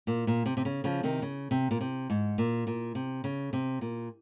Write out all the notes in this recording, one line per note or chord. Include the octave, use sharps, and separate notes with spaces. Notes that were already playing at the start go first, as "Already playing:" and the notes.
A#2
A#2
C3
C3
C#3
C#3 F3
C3 D#3
C#3
C3
A#2
C3
G#2
A#2
A#2
C3
C#3
C3
A#2